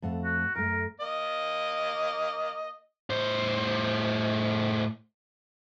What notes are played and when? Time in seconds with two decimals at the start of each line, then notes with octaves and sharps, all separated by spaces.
0.02 F2 A3 F#5
0.24 F#4
0.56 F#2 A3 A#4
1.01 A#3 D#5
3.10 A2 C5